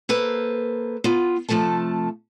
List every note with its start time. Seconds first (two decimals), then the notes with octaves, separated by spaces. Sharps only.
0.09 A#3 A4 B4 C5
1.04 B3 F4
1.49 C3 F3 A3 A4 A5